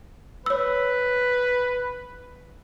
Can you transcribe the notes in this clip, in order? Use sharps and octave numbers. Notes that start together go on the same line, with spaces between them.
B4 C#5 E6